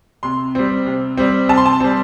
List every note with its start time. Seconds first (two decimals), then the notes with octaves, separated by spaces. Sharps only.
0.23 C3 C6
0.55 G3 C4
0.86 C3
1.17 G3 C4
1.49 C3 A5
1.57 C6
1.66 A5
1.80 G3 C4